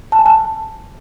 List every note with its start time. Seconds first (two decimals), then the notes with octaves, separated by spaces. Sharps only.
0.12 A5
0.19 G#5
0.26 A5